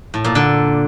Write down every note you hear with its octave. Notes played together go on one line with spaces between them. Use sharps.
A2
A#2
D3